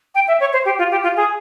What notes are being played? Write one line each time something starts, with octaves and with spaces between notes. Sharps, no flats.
G5
E5
C#5
C5
G4
F4
G4
F4
G#4